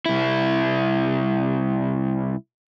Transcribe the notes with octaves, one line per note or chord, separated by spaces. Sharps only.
C2 E4